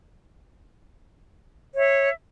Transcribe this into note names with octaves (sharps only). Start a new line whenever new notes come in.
C#5 E5